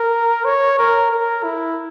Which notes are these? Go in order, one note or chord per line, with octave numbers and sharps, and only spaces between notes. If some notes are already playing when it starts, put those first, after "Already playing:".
Already playing: A#4
C#5
A#4
A#4
E4